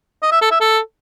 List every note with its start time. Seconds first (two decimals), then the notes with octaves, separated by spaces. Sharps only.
0.22 D#5
0.32 E5
0.42 A4
0.51 E5
0.61 A4